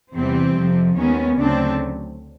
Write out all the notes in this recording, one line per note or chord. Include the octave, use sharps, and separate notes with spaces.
E2 C3 E3 G3 C4
F2 C3 F3
D#2 D#3 G#3 B3 C#4
D2 C#3 F#3 A3 C4 D4